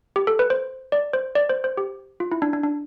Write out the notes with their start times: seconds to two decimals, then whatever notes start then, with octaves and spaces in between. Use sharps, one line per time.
0.16 G4
0.27 A4
0.39 B4
0.50 C5
0.92 D5
1.13 C5
1.35 D5
1.49 C5
1.64 C5
1.77 G4
2.20 F4
2.32 E4
2.42 D4
2.53 D4
2.63 D4